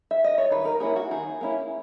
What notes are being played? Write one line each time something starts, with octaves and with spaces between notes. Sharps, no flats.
E5
D#5
C#5
D#3 B4
A#4
A#3 C#4 E4 G#4
F#4
D#3 G#4
A#3 C#4 E4